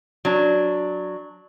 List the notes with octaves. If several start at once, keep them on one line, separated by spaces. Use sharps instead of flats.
F#3 D4